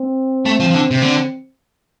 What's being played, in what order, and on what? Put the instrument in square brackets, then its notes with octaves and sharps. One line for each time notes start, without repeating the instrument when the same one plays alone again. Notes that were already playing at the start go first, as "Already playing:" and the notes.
Already playing: [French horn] C4
[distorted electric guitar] A3
F3
F3
D3
C3
D3